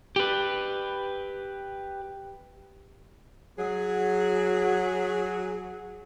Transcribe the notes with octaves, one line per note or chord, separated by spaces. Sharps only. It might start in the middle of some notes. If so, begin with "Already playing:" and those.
G4 B4
F#3 G#4